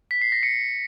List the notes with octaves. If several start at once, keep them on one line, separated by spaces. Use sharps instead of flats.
B6
C7
A#6
C#7